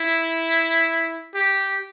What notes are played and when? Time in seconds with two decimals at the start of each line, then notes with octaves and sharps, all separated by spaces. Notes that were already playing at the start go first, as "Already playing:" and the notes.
Already playing: E4
1.34 G4